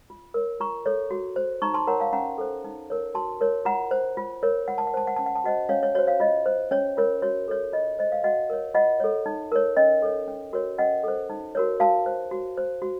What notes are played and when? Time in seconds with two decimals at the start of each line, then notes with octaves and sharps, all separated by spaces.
0.10 F4
0.34 A#4 C#5
0.60 F4 A#5 C#6
0.86 A4 C#5
1.11 F#4
1.36 C5
1.62 D#4 A#5 C#6
1.74 A5 C6
1.87 A#4 C#5 F#5 A#5
2.00 F5 A5
2.13 C#4 F#5 A#5
2.38 A4 C5
2.64 D#4
2.90 A#4 C#5
3.14 F#4 A5 C6
3.41 A#4 C#5
3.65 F4 F#5 A#5
3.91 C5
4.17 F4
4.43 A#4 C#5
4.68 F4 F#5
4.78 A5
4.87 F#5
4.94 C5 A5
5.07 F#5
5.16 C#4 A5
5.26 F#5
5.36 A5
5.44 F#4 C5 D#5 F#5
5.69 C#4 C#5 F5
5.83 C#5
5.95 F#4 C5 C#5
6.07 C#5 F5
6.20 F4 D#5
6.46 C5
6.71 C#4 C#5
6.97 F4 A#4 C#5
7.22 F#4 C#5
7.48 A4 C#5
7.73 F4 D#5
7.99 C5 D#5
8.12 F5
8.24 F#4 D#5 F#5
8.50 A#4 C#5
8.74 F4 D#5 F#5
9.00 A4 C#5
9.26 D#4
9.52 A#4 C#5
9.77 C#4 D#5
10.02 A4 C#5
10.28 C#4
10.53 F#4 A#4 C#5
10.78 C#4 D#5 F#5
11.04 A4 C5
11.30 D#4
11.55 F#4 A#4 C#5
11.80 F#4 F5 A5
12.06 C5
12.31 F#4
12.57 C5
12.82 F#4